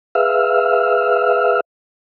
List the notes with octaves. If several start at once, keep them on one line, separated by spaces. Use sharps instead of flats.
G#4 B4 E5 F5 E6 F6